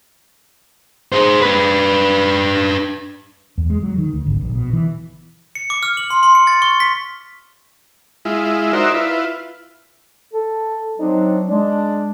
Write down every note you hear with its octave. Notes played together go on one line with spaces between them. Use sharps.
G#4 C5
D4 B4
E2
G#3
F#3
D#3
D2
G#1
A#1
B2
E3
C#7
D6
F6
F#7
C6
C6
C#7
A6
C#6
B6
G#3 E4 F4
D#4 F#4 A#4 C5 D5 E5
E4 F4 B4
A4
F#3 C4 D4 D#4
G#3 D4